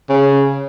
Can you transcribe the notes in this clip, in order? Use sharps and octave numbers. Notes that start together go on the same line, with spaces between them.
C#3